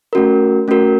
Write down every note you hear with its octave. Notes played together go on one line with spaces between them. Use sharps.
A3 C#4 F#4 A#4
A3 C#4 F#4 A#4